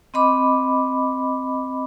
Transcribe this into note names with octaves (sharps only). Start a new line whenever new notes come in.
C4 D#5 B5 D6